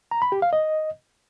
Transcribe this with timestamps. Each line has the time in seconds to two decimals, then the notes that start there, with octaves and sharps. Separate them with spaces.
0.11 A#5
0.22 B5
0.32 G4
0.42 F5
0.53 D#5